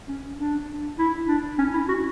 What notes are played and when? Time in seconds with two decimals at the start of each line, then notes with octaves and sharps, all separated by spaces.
0.08 C#4
0.38 D4
0.99 E4
1.28 D4
1.58 C#4
1.74 E4
1.88 F#4